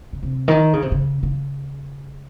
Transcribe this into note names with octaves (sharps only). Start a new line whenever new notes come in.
C#3
C3
D#3
C#3
C3
C#3
C#3